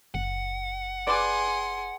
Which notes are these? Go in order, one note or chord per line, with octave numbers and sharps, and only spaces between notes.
F#1 F#5
G#4 B4 D5 C6 D6